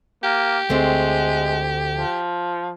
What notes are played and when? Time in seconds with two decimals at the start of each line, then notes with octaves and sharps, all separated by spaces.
0.24 A#3 G4
0.70 D2 G#3 A3 C4
1.95 F3